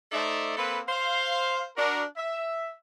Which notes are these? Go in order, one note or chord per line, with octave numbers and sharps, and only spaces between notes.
A3 D#4 A4 C5 D5 E5
A#3 C4 A4 B4
C5 F5
D4 F#4 A#4
E5